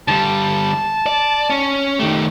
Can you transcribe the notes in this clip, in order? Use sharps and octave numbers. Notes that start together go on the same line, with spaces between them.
D3 G3 A5
D5
C#4
D#3 A3 G4